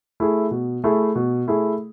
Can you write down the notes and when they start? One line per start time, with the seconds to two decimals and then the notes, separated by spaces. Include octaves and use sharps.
0.20 A3 E4 G#4
0.51 B2
0.84 A3 E4 G#4
1.15 B2
1.47 A3 E4 G#4